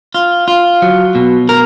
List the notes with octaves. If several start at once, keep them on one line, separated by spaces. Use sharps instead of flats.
F4
F4
F#3
B2
A#4